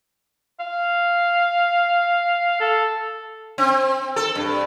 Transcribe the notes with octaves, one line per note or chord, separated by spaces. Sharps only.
F5
A4
C4
A4
G2